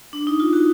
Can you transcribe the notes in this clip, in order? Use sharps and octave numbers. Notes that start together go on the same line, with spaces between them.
D4
D#4
F4
D#4 F#4